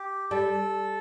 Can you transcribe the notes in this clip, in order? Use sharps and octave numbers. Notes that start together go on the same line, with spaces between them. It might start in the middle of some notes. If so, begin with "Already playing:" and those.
Already playing: G4
G3 A4